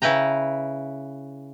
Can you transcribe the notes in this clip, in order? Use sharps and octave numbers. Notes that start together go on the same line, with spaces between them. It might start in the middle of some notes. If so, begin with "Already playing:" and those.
C#3 E4 B4 G5 A#5